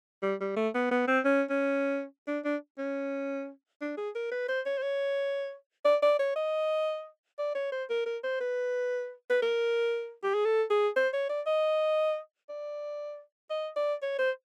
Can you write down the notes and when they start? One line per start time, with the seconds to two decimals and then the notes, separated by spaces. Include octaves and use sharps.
0.23 G3
0.41 G3
0.56 A3
0.75 B3
0.91 B3
1.08 C4
1.25 C#4
1.50 C#4
2.28 D4
2.44 D4
2.78 C#4
3.81 D4
3.97 G#4
4.15 A#4
4.32 B4
4.49 C5
4.66 C#5
4.78 C5
4.83 C#5
5.85 D5
6.02 D5
6.19 C#5
6.36 D#5
7.39 D5
7.55 C#5
7.72 C5
7.90 A#4
8.06 A#4
8.24 C5
8.40 B4
9.30 B4
9.42 A#4
10.23 G4
10.34 G#4
10.45 A4
10.70 G#4
10.96 C5
11.13 C#5
11.29 D5
11.46 D#5
12.49 D5
13.50 D#5
13.76 D5
14.03 C#5
14.19 C5